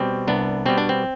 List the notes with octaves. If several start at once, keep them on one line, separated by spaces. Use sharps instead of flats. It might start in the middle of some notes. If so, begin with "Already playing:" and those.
Already playing: B2 G3 C4
C2 B3 D4
B2 G3 B3 C4
D4
C4